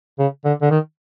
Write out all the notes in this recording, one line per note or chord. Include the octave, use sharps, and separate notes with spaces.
C#3
D3
D3
D#3